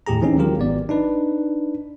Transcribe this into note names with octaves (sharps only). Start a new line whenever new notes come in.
D#2 A2 G4 G#4 A#5
E3 C4 C#4 D#4 G#4
D#3 F#3 G#3 F4 G4 A#4
G#1 B3 D5
D4 D#4 B4